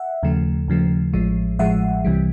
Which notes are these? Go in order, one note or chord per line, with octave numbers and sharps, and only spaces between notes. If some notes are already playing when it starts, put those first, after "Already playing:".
Already playing: E5 F#5
D#2 C#3 F3 A3
D#2 C#3 F3 A3
A1 A2 F3 G#3
A1 A2 F3 G#3 E5 F#5
C2 C3 E3 G3